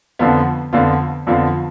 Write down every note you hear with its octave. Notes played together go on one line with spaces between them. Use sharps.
F2 D3 F3 B3 F4
F2 D3 F3 B3 F4
F2 D3 F3 B3 F4